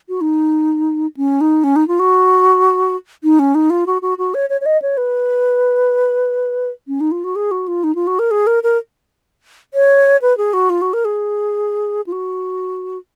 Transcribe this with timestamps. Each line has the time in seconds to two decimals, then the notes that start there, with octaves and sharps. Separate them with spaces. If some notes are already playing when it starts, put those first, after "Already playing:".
0.09 F#4
0.21 D#4
1.17 C#4
1.41 D#4
1.64 C#4
1.76 D#4
1.88 F4
1.99 F#4
3.23 D#4
3.39 C#4
3.55 D#4
3.70 F4
3.86 F#4
4.02 F#4
4.18 F#4
4.34 C#5
4.50 C#5
4.61 C#5
4.66 D#5
4.82 C#5
4.97 B4
6.88 C#4
7.00 D#4
7.11 F4
7.24 F#4
7.36 G#4
7.51 F#4
7.68 F4
7.84 D#4
7.95 F4
8.07 F#4
8.19 A#4
8.31 G#4
8.47 A#4
8.63 A#4
9.74 C#5
10.22 B4
10.37 G#4
10.53 F#4
10.70 F4
10.82 F#4
10.93 A#4
11.05 G#4
12.07 F4
12.12 F#4